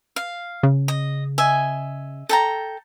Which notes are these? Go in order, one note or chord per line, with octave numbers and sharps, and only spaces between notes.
F5
C#3
D#5
D#5 E5 G#5
A4 G5 A#5